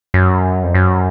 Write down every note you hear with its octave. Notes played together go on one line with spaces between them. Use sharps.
F#2
F2
F#2